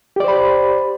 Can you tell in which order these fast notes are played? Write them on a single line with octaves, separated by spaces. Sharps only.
G4 D5 C5 B5